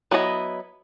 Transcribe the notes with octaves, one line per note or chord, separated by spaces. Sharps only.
F#3 B3 E4 G#4 D#5